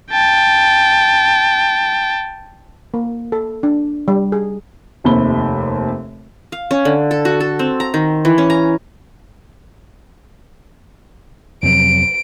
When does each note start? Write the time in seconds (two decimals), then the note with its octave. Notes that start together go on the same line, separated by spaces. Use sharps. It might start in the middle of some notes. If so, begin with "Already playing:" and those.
0.11 G5 A5
2.94 A#3
3.32 A4
3.63 D4
4.08 G3
4.32 G#4
5.04 F1 D#2 C3 B5 G7
6.52 F5
6.71 C#4
6.85 D3
7.11 A4
7.25 F#4
7.40 A4
7.59 C4
7.80 A#5
7.94 D#3
8.25 E3
8.38 C#4
8.50 A#5
11.63 F2 C3 F#3 D7